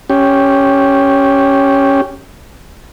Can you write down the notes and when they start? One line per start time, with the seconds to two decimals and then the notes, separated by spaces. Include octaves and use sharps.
0.10 C#4 G4